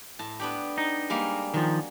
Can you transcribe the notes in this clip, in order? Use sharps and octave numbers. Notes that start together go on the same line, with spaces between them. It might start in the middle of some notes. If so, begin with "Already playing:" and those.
A2 A5
B3 D4 G4
D#4
G3 G#3 A#3
D#3 F3 F#3